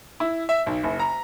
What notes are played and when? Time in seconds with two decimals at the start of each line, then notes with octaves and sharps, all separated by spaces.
0.20 E4
0.49 E5
0.66 B1
0.83 F#1
1.00 A#5